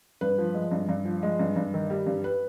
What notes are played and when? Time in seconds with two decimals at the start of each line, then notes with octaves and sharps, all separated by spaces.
0.21 G2 B4
0.38 F3
0.54 G#3
0.72 G2
0.89 G2
1.05 F3
1.23 G#3
1.39 G2
1.56 G2
1.74 D#3
1.90 G3
2.07 G2
2.24 B4